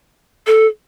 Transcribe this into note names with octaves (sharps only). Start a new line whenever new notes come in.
A4